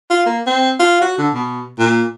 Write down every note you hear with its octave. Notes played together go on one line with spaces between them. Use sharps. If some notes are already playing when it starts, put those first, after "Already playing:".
F4
A#3
C4
F4
F#4
D3
B2
A#2